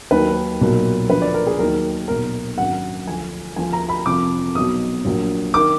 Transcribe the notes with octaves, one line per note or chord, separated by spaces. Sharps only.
D#2 D#3 F#3 B4
B1 A#2 F#3
D2 D3 F3 B4
D5
A#4
G#4
D#2 D#3 F#3 A#4
B1 A#2 F#3 A#4
G#1 F#2 D3 F#3 F#5
D2 D3 F3 G#5
D2 D3 F3 G#5
A#5
B5
F1 F2 F3 D6
B1 B2 F#3 D#6
A#1 A#2 F#3
D#3 D6